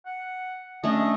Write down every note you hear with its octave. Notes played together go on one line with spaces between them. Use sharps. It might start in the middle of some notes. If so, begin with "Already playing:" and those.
F#5
A3 C#4 D4 D#5